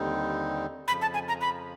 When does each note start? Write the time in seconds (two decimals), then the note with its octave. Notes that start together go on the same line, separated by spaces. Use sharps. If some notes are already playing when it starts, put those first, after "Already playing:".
Already playing: D#2 D3 G3 C4 D#4
0.88 F2 C#3 F3 B5
1.02 A5
1.14 G#5
1.28 A#5
1.41 B5